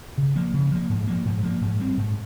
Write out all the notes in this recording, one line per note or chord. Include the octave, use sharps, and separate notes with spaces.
C#3
F3 A#3
C#3
F3 A#3
G#2
F3 A#3
G#2
F3 A#3
G#2
G3 C4
G#2